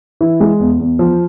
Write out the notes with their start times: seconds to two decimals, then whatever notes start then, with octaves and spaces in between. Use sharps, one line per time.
0.21 E3
0.40 G#3
0.60 E2
0.80 E2
0.99 F3